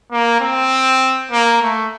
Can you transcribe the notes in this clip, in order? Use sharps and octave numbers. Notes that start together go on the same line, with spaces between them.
A#3
C4
A#3
A3